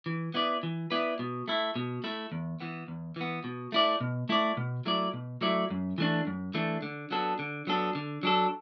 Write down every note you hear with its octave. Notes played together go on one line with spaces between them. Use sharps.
E3
B3 E4 B4 D5
E3
B3 E4 B4 D5
B2
A3 E4
B2
A3 E4
E2
E3 B3
E2
E3 B3
B2
A3 E4 D5
B2
A3 E4 D5
B2
F#3 A3 E4 D5
B2
F#3 A3 E4 D5
F#2
E3 A3 D4
F#2
E3 A3 D4
D3
F#3 B3 D4 A4
D3
F#3 B3 D4 A4
D3
F#3 D4 A4